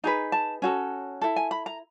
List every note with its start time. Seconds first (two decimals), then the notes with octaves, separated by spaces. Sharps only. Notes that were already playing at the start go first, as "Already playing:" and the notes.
0.04 D#4 G#4 B4 A#5
0.32 A5
0.62 C#4 F#4 A4
1.22 E4 A4
1.36 G#5
1.51 B5
1.66 A#5